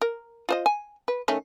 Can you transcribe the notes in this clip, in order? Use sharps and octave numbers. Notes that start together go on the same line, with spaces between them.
A#4
F4 C5 D#5
G#5
B4
D#3 A3 C#4